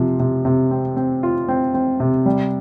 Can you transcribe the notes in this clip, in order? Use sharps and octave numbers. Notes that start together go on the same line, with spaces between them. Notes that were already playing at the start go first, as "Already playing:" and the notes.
Already playing: C3 F3
C3
C3
C4
C4
F4
C4
C4
C3
G3